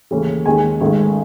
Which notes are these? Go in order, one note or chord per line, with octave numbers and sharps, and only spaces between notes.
D#2 C#3 E3 A3 C#4
D#2 D#3 G#3 C#4 G#5
G#1 G#2 D#3 A3 C#4